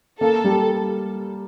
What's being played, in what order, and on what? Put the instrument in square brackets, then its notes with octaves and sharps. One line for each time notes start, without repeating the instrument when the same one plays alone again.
[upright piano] A#3 [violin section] A4
[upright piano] G3